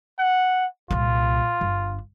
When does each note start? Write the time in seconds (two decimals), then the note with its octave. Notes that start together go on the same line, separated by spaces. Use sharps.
0.19 F#5
0.91 C2 A#2 F4
1.61 G1 D4